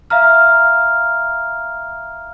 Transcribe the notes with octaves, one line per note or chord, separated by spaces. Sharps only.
E5 F5 A#5 F6